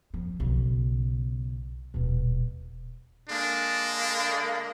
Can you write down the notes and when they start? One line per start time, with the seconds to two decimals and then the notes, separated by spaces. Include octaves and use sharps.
0.14 F3
0.40 B1 C#3
1.94 D#1 B2
3.29 D3 G#3 A#3 D4